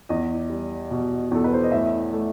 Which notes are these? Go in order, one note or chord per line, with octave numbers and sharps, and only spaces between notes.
E2 D#5
G3
B2
E2 A4
B4
C5
D#5
A2 E5
A3